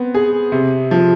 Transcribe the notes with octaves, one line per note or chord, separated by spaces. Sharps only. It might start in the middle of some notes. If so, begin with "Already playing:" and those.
Already playing: B3 C4
G#4
C3
F3